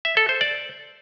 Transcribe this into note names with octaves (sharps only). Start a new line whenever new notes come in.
E5
A4
C5
D5